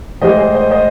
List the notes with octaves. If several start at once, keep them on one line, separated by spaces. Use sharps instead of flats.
A2 E3 G#3 C5 D#5
G#4 C5
C5 D#5
C5 D#5